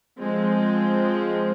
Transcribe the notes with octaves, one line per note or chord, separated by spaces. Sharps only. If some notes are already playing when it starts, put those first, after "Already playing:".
F3 G#3 C4